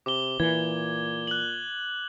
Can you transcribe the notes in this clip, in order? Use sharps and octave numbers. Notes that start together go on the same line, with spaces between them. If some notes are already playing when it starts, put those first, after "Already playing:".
C3 D6 G7
A#2 E3 G#6 G7
F#6 F#7